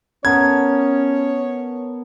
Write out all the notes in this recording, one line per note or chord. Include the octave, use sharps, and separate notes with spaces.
B3 C#4 A#4 C#5 A5 G#6